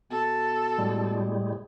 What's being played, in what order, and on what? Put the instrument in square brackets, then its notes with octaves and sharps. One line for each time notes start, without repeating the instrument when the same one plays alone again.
[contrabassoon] B2 [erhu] A4
[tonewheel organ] A2 G3 G#3